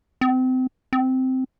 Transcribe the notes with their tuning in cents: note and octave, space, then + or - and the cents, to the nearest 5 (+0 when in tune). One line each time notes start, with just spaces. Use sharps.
C4 -30
C4 -10